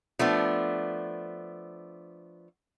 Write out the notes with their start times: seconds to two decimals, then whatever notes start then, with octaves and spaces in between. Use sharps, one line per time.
0.19 F3 A3 B3 D4